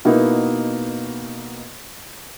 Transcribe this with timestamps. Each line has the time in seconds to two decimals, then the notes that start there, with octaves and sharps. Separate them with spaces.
0.05 B2 A#3 B3 D#4 E4